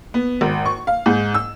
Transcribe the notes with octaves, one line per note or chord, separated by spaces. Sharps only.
B3
G#1
C#6
F5
G#2
E6